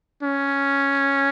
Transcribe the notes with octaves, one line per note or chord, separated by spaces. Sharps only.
C#4